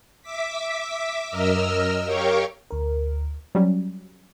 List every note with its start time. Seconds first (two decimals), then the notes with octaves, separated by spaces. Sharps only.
0.22 E5 D6 B6
1.30 F#2 A#4 D#5 E6 F6
2.05 G4 A#4 C#5 F5 G5 C#6
2.71 D2 A#4
3.55 F#3 G3 C#4